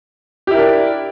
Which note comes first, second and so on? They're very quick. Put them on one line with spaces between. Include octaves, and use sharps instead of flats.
G4 E4 A#4 D4